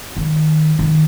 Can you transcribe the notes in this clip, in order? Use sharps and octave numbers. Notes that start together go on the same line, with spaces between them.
D#3
D#3